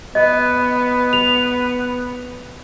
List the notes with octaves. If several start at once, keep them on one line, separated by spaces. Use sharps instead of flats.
B3 D#5
F7